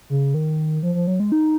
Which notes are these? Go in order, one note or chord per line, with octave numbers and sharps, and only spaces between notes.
C#3
D#3
F3
F3
F#3
G#3
D#4